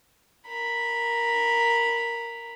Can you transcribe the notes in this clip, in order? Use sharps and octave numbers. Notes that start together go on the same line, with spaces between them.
A#4 B5